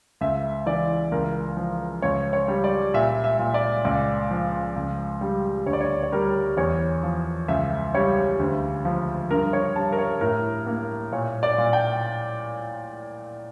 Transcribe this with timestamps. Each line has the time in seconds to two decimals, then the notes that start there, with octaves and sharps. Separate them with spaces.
0.21 C#2 E5
0.66 E3 D5
1.12 C#2 A#4
1.57 F3
2.02 C#2 C#5
2.33 C#5
2.48 G3
2.64 D5
2.94 A#2 E5
3.24 E5
3.39 A#2
3.54 D5
3.85 C#2 D5
4.31 F3
4.76 C#2
5.21 G3
5.66 D2 C#5
5.73 D5
5.81 C#5
6.03 C#5
6.12 G3 A#4
6.57 E2 C#5
7.03 F3
7.48 C#2 E5
7.94 G3 C#5
8.39 D2
8.85 F3
9.31 G2 A#4
9.53 C#5
9.75 G3 A5
9.92 A#4
9.98 C#5
10.21 A2 A#4
10.67 A#3
11.12 A#2 C#5
11.43 D5
11.58 A#2
11.73 G5